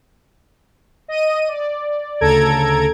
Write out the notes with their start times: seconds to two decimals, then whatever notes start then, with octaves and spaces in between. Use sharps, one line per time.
1.08 D#5 D#7
1.48 D5
2.21 D2 C#3 A4 A#5 G#6 D7